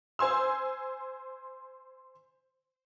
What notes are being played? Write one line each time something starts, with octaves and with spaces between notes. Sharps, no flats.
C5 G#5 C6 E6